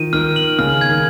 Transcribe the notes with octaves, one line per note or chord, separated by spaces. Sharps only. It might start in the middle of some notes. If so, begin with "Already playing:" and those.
Already playing: D#3 F3 D#7
D#3 F6
F#7
C#3 F6
G#6
D#3